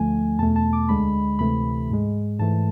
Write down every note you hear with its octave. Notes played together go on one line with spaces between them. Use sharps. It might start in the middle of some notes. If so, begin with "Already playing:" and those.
Already playing: D2 D3 F3 A3 G#5
E2 B2 A3 A5
A5
D6
D2 D3 G#3 B5
D2 C3 E3 A3 B5
G#2 G#3
G#2 E3 A3 A5